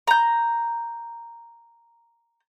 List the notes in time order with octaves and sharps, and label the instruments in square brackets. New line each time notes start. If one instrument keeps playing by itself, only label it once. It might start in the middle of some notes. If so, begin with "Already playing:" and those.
[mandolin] A#5 G6